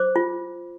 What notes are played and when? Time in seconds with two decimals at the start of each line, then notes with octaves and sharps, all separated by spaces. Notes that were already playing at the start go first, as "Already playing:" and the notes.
Already playing: C5 D6
0.16 F4